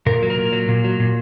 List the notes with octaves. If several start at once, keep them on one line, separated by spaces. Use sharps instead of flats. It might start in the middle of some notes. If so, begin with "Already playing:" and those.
A#2 A#4
F#3
A#4
A#2
F#3
A#2
F#3
A#2